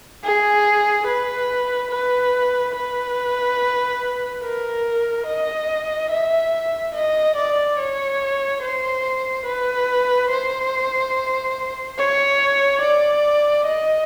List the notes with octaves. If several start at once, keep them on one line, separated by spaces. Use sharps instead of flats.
G#4
B4
B4
B4
A#4
D#5
E5
D#5
D5
C#5
C5
B4
C5
C#5
D5
D#5